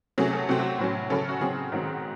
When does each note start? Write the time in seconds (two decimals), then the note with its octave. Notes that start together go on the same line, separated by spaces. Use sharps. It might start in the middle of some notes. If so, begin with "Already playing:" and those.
0.18 C3 F#3 A3 C#4 G#4
0.33 A4
0.49 C3 F#3 A3 C4 F#4
0.59 F#4
0.79 A2 F#3 C#4
1.10 C#3 F#3 C#4 A4
1.29 F#4
1.41 C#3 F#3 C4 G#4
1.72 G#2 D#3 F#3 C4